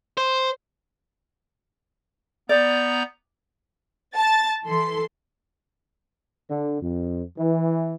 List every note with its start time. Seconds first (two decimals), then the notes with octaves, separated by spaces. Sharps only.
0.17 C5
2.49 B3 D5 A#5 G6
4.15 A5 A6
4.66 E3 A4 C6
6.50 D3
6.82 F2
7.38 E3